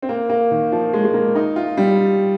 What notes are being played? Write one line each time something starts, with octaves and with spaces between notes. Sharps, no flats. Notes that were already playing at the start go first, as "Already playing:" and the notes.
C4
A#3
A#3
D#3
F3
G#3
G#3
A#3
D#4
F4
G3